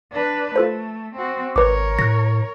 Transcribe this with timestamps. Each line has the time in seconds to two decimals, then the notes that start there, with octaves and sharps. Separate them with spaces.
0.11 D4 B4
0.56 A3 F4 A4 C5
1.16 C4 F#4
1.56 G#1 A#4 B4 C#5 D6
1.99 A2 F#6 A#6